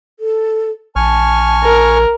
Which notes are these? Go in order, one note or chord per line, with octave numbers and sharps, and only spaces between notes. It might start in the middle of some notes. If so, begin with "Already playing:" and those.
A4
A#1 G#5 A5 C#6 F6
A#4